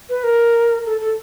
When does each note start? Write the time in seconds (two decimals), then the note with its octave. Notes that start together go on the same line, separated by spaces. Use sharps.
0.09 B4
0.24 A#4
0.86 A4
1.01 A4